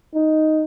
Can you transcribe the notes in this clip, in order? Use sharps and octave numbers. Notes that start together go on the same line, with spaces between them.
D#4